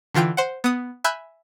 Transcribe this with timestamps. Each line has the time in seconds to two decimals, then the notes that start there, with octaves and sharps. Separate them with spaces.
0.14 D3 E3 F4 G5 D7
0.37 C5 F#5
0.64 B3 D#6
1.04 E5 G#5 B5 F#6 G6